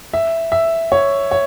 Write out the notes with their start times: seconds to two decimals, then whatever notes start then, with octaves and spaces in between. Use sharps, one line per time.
0.13 E5
0.52 E5
0.92 C#5
1.31 C#5